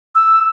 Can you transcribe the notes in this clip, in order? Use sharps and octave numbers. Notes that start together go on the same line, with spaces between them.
E6